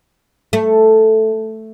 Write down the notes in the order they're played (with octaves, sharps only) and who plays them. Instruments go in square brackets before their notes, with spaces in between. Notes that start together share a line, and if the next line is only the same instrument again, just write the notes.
[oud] A3